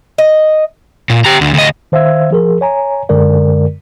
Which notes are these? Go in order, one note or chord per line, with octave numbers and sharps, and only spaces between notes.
D#5
A#2
G4 A#5
D2
D2 D#5
D#3 C5 E5 F5 E6 G#6
F3 G#4 A#4
C#5 G#5 A#5
F#2 D3 G#3 A#4 D5